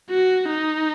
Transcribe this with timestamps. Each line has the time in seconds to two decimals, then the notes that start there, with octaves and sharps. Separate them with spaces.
0.10 F#4
0.49 D#4